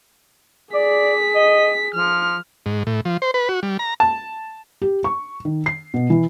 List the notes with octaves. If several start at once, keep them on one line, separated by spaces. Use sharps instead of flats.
G#4 D5 B6
D#5
F3 F6
G#2
A2
F3
C5
B4
F#4
G3
A#5
A5
G4
C#6
D#3
C7
B2
E3